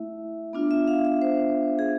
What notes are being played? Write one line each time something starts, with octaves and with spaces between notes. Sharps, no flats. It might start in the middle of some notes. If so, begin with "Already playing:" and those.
Already playing: A3 E4 E5
B3 D4 F4
E5
F5
E5
C5
G#4